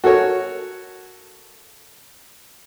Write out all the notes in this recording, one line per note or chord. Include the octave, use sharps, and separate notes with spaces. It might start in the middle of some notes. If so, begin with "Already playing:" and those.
F#4 A4 A#4 C#5